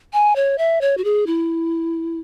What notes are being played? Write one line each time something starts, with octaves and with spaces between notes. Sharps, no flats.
G#5
C#5
E5
C#5
F#4
G#4
E4